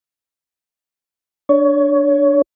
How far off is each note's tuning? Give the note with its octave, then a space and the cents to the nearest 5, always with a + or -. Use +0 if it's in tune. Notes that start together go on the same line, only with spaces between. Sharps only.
D4 +0 C#5 +20